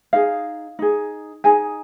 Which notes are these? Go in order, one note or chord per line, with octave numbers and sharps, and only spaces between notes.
D#4 G#4 F5
D#4 G#4
D#4 G#4 G#5